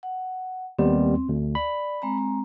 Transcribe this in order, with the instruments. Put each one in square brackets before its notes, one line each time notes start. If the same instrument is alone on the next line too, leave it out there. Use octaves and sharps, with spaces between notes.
[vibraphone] F#5
[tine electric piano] D#2 G3 B3 [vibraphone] C4
[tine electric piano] D2
[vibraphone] D5 [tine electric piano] B5
[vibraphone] G#3 C4 A#5